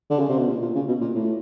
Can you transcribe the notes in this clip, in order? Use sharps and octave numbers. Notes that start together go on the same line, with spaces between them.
D3
C#3
C3
B2
A#2
A#2
C#3
B2
A#2
A2